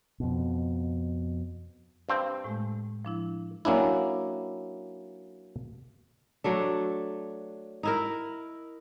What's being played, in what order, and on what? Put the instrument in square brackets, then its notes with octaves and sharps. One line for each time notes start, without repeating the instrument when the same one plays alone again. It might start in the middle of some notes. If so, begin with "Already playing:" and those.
[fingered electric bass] F2 B2
[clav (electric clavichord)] G2 C4
[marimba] A2 G#3 A3
F3 D4 E4
[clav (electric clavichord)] F#3 A#3 C#4 D4 E4
[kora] F#3 A3 D4
D#4 E4 A#4